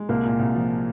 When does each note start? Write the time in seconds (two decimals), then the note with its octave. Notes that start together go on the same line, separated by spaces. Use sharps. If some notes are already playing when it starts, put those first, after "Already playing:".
Already playing: G#3
0.09 C2 A#3
0.25 A#2
0.39 C2
0.55 F3